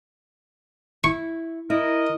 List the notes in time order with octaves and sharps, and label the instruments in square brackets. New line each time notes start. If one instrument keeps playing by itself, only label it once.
[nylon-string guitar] E4 [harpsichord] C#6
[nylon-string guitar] E4 [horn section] A#4 D#5